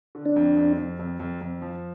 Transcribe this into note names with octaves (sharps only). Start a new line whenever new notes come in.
D3
D4
F2
F2
F2
F2
F2
F2
F3